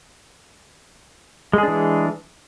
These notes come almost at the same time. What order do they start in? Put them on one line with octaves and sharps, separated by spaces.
G#3 G#4 D4 E3